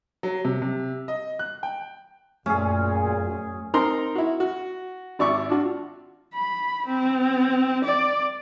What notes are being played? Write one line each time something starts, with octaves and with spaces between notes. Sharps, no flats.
F#3
C3
C3
D#5
F#6
G5
F#2 A#2 A3 C#4 G#4
C4 D#4 A#4 A#5 C6
E4 F#4
F#4
G#1 D5 E5 C#6 D6
D4 F4 F#4
B5
C4
D5